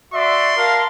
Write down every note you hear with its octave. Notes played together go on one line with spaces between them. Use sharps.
F#4 D5 E5 C6
A#4 F5 A5